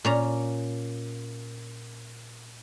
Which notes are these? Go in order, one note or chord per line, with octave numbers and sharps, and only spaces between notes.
A#2 C#4 A#5